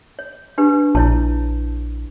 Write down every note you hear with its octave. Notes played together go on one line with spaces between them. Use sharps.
C#5
D4 G4 B4
A#1 E4 C#5 A5